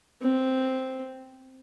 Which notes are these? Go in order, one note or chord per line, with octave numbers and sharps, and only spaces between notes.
C4